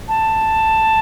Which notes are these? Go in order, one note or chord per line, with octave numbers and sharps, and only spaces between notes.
A5